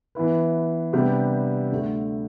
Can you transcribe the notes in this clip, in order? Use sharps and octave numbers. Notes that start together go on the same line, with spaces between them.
E3 B3 E4 B4
C3 G3 B3 D4 G4
D2 D3 A3